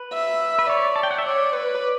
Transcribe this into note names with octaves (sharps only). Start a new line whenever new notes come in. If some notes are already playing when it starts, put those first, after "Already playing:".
Already playing: B4
E5
B4
C#5 D5
A5
G5
F#5
E5
C#5 D5
B4